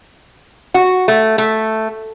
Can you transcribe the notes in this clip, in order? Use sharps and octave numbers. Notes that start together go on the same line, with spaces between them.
F#4
A3
A3